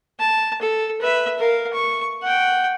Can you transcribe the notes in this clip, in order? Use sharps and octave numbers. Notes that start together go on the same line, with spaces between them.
A5
A4
B4 E5
A#4 F5
C#6
F#5 G5